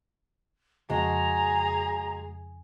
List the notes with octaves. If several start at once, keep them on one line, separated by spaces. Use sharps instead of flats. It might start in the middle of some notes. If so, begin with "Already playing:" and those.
F2 C#3 G#3 F#4 G#4 A#5